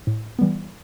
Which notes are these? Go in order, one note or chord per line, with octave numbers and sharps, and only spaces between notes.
A2
E3 G3 B3